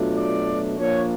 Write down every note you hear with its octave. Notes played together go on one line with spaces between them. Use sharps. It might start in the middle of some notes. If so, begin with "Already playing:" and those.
Already playing: B2 F#3 A3 D4 F4
D5
A#2 F3 A#3 D4 C#5